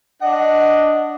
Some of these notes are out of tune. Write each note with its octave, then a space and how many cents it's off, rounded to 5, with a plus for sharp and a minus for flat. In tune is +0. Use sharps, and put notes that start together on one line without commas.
D4 +0 D#5 +0 F#5 +0